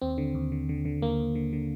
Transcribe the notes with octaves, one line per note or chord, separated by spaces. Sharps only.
D#2 C4
D3
D#2
D3
D3
D3
D#2 A#3
D#2
D3
D3